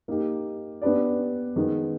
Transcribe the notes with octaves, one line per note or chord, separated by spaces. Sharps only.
A#3 D#4 G4
B3 D4 G4 B4 D5
D#3 G#3 B3